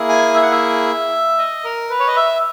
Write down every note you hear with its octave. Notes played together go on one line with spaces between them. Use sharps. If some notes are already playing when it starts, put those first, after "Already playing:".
Already playing: A#3 E4 G#4
G#5
E5
F#5
E5
D#5
A#4
B4
C#5
D#5
E5